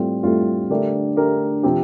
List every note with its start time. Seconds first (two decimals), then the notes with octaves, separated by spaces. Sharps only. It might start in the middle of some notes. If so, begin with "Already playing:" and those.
Already playing: A2 G3 C4 F4 A4
0.23 A2 G3 C4 F4 A4
0.70 D3 A3 D4 G4 A#4
1.17 D3 A3 D4 G4 A#4
1.63 C3 F3 C4 G4